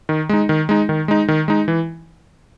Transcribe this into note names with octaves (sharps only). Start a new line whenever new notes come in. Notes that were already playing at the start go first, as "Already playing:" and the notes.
D#3
G#3 D#4
D#3
G#3 D#4
D#3
G#3 D#4
D#3
G#3 D#4
E3